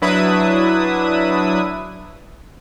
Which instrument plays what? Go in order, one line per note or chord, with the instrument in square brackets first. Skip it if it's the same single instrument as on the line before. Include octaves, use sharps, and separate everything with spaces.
[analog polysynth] F#3 D4 E4 B4 E5 D#6